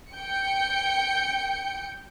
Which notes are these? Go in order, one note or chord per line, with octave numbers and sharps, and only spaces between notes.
G5 G6 C#7